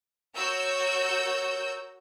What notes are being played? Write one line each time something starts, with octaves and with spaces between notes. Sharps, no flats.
F#4 A#4 C#5 E6 G6